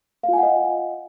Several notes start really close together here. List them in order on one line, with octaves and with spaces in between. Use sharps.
F5 F4 G#5 F#5 D#5